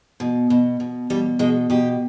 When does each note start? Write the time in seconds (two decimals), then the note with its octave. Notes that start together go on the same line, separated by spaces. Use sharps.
0.20 B2
0.50 B2
0.80 B2
1.10 B2 G3
1.39 B2 G#3
1.70 B2 G4